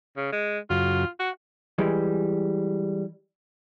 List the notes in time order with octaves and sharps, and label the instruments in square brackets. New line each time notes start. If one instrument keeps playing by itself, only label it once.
[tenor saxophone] C#3
G#3
[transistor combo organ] F#2 C#3 F#4 [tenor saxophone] F4
[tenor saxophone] F#4 [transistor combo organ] F#5
[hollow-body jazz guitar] E3 G3 G#3